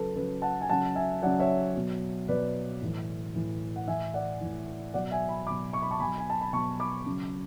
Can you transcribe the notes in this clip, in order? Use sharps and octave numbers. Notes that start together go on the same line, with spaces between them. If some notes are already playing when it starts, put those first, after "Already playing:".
Already playing: C#3 F#3 A4 B4
C#3 F#3 B4
F#5 A5
G#5
C#3 F#3 F#5 A5
E5 G#5
C#3 F#3 D5 F#5
C#5 E5
B2 F#3
B2 F#3 B4 D5
A2 E3
A2 E3
F#5
A2 E3 E5 G#5
D5 F#5
A2 E3
B2 F#3 D5 F#5
E5 G#5
G#5 B5
B2 F#3 B5 D6
C#6
B5
A5 C#6
B2 F#3 G#5 B5
G#5
A5
B5
B2 F#3 A5 C#6
B5 D6
C#3 F#3